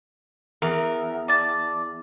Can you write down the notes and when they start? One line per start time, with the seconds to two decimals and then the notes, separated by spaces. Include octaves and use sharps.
0.62 E2 A#4
1.28 D5 A5